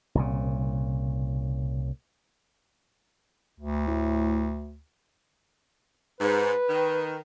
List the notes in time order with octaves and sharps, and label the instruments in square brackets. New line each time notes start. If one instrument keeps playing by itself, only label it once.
[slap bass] C2 A#2 C#3
[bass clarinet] D2
[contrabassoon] A2
[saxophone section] G#2 [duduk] B4
[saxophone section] D#3